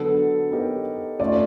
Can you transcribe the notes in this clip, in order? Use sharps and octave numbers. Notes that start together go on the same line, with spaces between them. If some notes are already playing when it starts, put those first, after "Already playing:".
Already playing: D3 F#3 B3 D4 A4
B3 D#4 G4 A#4 C#5
A3 C#4 F4 D5